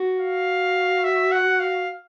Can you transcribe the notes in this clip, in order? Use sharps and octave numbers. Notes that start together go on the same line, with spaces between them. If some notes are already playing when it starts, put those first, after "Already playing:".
Already playing: F#4
F5
E5
F#5
F5